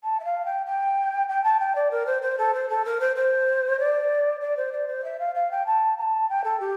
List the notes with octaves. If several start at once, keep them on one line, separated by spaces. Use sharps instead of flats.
A5
E5
F5
G5
G5
G5
A5
G5
D5
A#4
C5
C5
A4
C5
A4
A#4
C5
C5
D5
D5
C5
D5
C5
E5
F5
F5
G5
A5
A#5
A5
G5
A4
G4